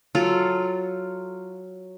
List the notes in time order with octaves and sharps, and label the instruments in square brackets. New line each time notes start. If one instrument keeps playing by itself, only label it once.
[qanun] F#3 F4 A4